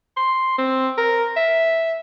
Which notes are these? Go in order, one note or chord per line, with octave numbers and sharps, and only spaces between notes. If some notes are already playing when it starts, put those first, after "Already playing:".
C6
C4
A#4
E5